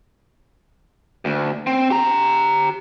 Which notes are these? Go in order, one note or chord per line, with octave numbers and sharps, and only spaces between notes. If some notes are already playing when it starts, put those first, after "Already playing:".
D2
C4
G4 A#5